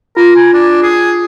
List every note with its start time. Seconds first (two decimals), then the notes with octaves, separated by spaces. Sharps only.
0.17 F4 A#4
0.36 G#5
0.53 D4
0.83 G#4